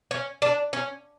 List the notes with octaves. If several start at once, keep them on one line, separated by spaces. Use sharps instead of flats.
C#4
D4
C#4